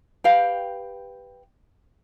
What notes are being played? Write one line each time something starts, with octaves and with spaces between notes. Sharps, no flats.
G4 B4 F5 G5